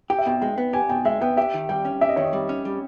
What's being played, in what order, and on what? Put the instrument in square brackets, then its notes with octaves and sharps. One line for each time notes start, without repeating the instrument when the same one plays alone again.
[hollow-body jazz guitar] G4 [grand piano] G5
[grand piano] E5
[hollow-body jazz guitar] B2 [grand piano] G5
[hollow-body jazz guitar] G#3 [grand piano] G5
[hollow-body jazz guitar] B3
[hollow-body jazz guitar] G4 [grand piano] G#5
[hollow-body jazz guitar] B2 [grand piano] G5
[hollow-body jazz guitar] G#3 [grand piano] E5
[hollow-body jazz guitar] B3 [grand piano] G5
[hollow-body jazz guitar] G4 [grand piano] E5
[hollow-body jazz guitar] D#3
[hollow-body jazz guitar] G3 [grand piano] G5
[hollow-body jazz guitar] C#4
[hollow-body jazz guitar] G4 [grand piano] E5
[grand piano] D#5
[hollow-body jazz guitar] D#3 [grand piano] C#5
[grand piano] D#5
[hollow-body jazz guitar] G3
C#4
G3